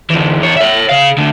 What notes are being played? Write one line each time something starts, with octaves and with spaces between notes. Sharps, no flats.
D2 E3
E2 C#5
C#5 E5
C#3 F5
D2 D3